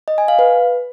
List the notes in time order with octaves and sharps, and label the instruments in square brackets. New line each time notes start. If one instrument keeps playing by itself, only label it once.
[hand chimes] D#5
G#5
F5
B4